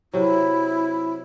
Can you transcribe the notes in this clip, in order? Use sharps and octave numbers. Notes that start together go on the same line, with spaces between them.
C3 F#3 E4